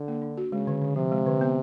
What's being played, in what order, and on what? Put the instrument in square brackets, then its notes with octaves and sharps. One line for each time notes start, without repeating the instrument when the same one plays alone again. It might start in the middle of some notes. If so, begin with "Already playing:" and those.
Already playing: [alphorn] D3
[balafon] A#3
D4
F#4
[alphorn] C#3 [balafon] G#3
[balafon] D3
D3
[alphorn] C3 [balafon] F3
[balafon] G#3
D3
B3